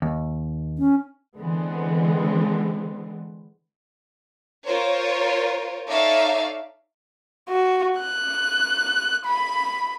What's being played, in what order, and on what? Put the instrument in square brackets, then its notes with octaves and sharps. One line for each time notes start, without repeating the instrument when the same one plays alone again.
[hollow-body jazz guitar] D#2
[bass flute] C#4
[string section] D3 E3 G#3 B3 C4
[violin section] F4 A#4 C5 C#5
D#4 A4 C#5 D5 E5 F5
[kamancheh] F#4
F#6
B5